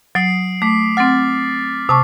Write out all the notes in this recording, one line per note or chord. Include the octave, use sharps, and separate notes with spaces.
F#3 D#6 C7 D7
A3 D6 B6
C4 F#5 F6 A6
C3 A5 C#6 D6